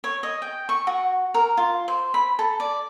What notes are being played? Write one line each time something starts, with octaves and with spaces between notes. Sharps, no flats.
C#5
D#5
G5
C#6
F#4
A#4
F4
C5
B5
A4
D5